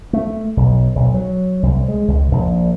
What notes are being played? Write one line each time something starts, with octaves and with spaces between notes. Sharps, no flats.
A3
B1
B1
F#3
C2
G#3
C#2
A#1